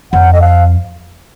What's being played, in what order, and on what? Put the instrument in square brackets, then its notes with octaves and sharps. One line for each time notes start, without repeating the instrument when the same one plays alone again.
[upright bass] F2 [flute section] F#5
[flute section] D#5
F5